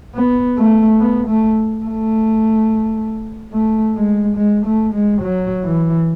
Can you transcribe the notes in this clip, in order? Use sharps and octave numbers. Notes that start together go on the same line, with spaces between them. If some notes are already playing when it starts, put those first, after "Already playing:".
B3
A3
B3
A3
A3
A3
G#3
G#3
A3
G#3
F#3
E3